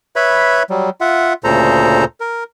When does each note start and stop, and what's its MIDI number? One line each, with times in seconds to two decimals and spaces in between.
0.16 0.63 71
0.16 0.63 73
0.16 0.63 76
0.16 0.63 83
0.70 0.90 54
0.70 0.90 55
1.01 1.33 65
1.01 1.33 76
1.01 1.33 78
1.44 2.05 38
1.44 2.05 46
1.44 2.05 49
1.44 2.05 69
1.44 2.05 72
1.44 2.05 82
2.20 2.44 70